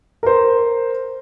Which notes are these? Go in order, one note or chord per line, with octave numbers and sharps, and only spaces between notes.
A#4 C5